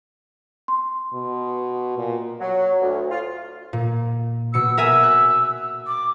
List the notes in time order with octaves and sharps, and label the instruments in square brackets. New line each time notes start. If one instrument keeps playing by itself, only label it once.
[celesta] C6
[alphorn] B2
A#2
[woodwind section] F#3
D2
F4
[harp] A#2
[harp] B2 C#7 [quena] E6
[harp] A#4 E5 G#5 [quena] E6
[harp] F#6
[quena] D6